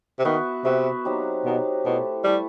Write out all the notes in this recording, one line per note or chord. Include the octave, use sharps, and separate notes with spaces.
C3
D#3 B3 F#4 B4 E5
C3 B3 F#4 B4 E5
F#3 C4 D#4 G4
B2 F#3 C4 D#4 G4
B2 A3 E4 A4
G3 A3 E4 A4